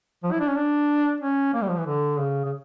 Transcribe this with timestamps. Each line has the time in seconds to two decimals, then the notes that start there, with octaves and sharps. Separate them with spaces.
0.23 F3
0.32 E4
0.40 D4
0.48 C#4
0.56 D4
1.21 C#4
1.53 A#3
1.62 G3
1.69 F3
1.78 E3
1.86 D3
2.18 C#3
2.45 C#3